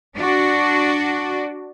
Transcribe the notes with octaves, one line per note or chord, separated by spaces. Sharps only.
D4 F#4